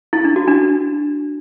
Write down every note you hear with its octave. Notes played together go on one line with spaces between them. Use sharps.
E4
D4
F#4
D4